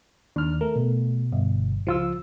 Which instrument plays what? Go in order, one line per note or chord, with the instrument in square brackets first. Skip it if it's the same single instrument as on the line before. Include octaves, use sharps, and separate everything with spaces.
[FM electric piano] D#2 F6 [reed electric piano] D4
[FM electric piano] A3 [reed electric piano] A#4
[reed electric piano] B2
[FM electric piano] G1
[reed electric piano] C#2 F4 E6 [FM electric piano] F3